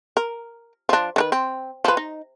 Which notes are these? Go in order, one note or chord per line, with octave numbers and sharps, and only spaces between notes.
A#4
F3 D4
D#3 D4 B4
C4
F3 B4
D#4